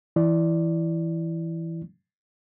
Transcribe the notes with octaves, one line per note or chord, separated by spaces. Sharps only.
E3 E4 D5